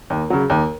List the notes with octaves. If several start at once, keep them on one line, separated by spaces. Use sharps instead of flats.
D#2
C#3 F#3
D#2